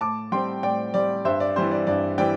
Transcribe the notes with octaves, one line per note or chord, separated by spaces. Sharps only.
A2 A5 D6
G3 C4 G5 C6
A2 D5 G5
G3 C4 D5
G2 C5 E5
D5
E3 G3 C4 C5
D5
G2 D5
E3 G3 C4 D5 G5